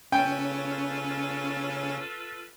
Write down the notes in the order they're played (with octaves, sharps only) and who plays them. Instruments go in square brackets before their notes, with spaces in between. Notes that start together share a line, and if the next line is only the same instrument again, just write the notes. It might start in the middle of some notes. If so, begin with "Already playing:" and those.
[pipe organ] C#3 [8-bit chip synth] C#4 [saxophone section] F4 A4 B4 [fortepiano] G5